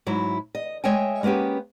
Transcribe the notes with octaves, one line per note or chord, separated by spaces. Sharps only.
G#2 F#3 E4
D#5
G#3 C#5 D#5 E5 G5 G#5
G#3 A#3 B3 C#4 G4